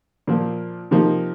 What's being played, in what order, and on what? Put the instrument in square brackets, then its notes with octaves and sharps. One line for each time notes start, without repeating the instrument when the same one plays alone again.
[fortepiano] A#2 F3 A#3
C3 F3 A#3 D#4